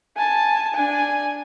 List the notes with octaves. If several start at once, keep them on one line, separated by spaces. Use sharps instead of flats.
G#5 A5
D4 G#5